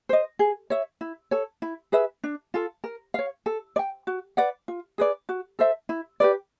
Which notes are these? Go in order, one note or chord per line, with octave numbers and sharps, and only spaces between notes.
C5 D#5
G#4
C#5 E5
E4
A4 C#5
E4
G#4 B4 E5
D4
F4 A4
A#4
C#5 F5
A4
D5
G5
F#4
B4 D5 F#5
F4
G#4 B4 D5
F#4
A4 C5 E5
E4
G4 B4 D5